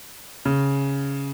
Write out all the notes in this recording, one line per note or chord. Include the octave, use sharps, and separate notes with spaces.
C#3